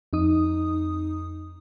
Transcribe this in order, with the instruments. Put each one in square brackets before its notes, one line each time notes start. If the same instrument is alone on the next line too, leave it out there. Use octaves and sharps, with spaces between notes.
[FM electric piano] F2 D#4 D#6